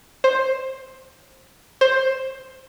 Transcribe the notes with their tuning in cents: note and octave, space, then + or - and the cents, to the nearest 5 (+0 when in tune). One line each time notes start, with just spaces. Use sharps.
C5 +10
C5 +10